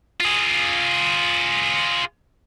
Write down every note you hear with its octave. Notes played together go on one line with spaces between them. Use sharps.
F4 G#4